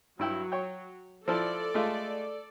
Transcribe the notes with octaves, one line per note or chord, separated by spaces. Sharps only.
G2 F#3 E4 G5
C#5 G5
F3 E4 A4 D5 A5
G#3 A3 F4